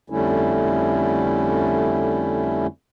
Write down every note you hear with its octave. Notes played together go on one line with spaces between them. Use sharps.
F2 D3 G3 A3 C#4 E4